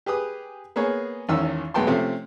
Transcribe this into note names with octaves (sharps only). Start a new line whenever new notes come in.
G4 G#4 B4 D#6
A#3 B3 G#4 C#5
G#1 E2 D#3 C#4 E6
B1 G#3 B3 G5 A5 C6
C3 F3 A3 C4 C#4